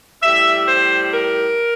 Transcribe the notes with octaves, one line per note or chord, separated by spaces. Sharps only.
A2 G3 E5
C5
A#4